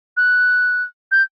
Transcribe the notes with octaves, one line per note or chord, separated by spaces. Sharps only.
F#6
G6